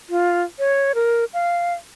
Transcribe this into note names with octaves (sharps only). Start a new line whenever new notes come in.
F4
C#5
A#4
F5